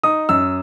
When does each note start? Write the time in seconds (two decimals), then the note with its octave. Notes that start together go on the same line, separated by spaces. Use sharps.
0.03 D#4 D#6
0.29 F#2 E6